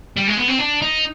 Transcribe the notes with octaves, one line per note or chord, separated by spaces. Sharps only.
G3
G#3
B3
C4
D4
D#4